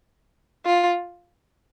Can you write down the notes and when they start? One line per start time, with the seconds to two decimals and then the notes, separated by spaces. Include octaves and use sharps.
0.65 F4